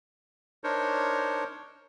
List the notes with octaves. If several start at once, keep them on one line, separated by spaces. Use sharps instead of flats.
D4 D#4 A#4 C5 C#5